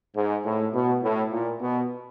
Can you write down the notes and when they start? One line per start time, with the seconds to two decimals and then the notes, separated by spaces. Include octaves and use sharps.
0.16 G#2
0.45 A2
0.74 B2
1.03 A2
1.32 A#2
1.61 B2